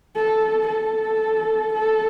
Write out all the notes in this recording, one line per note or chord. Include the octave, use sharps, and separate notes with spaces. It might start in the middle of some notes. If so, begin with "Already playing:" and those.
A4
A4
A4